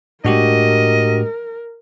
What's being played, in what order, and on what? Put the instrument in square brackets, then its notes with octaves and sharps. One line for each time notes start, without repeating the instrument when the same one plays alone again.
[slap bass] A2 G#3 [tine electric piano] D4 F#4 G4 [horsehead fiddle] A#4 [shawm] D#5